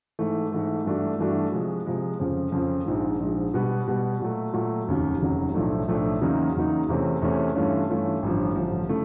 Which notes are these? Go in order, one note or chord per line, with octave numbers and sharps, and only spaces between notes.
G#2 E3 A3
G#2 E3 A3
G2 E3 A3 D4 F#4
G2 E3 A3 D4 F#4
C3 F3 G#3
C3 F3 G#3
F2 C#3 F3
F2 C#3 F3
A#1 G#2 F3
A#1 G#2 F3
B2 G3 B3
B2 G3 B3
A#2 F#3 A3
A#2 F#3 A3
F1 D#2 C#3 F#3
F1 D#2 C#3 F#3
B1 A2 F3 A3 D4
B1 A2 F3 A3 D4
E2 C#3 F#3 A#3 D#4
E2 C#3 F#3 A#3 D#4
E2 C3 E3 A3 C#4
E2 C3 E3 A3 C#4
G2 E3 A3 C#4 F4
G2 E3 A3 C#4 F4
A1 G2 D3 F3
A1 G2 D3 F3
C#3 A3 E4